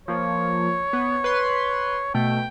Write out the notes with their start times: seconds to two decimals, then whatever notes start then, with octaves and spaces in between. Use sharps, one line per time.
0.08 F3 A#3 C#5
0.93 B3
1.24 B4 C6
2.14 B2 A3 G5